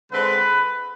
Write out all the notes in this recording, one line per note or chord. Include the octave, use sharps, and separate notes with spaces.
D3 G#3 C4 B4